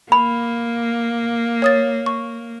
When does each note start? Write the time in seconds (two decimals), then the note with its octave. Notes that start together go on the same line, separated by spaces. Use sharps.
0.12 A#3 B5
1.62 C#5 D#6 A6
2.06 C#6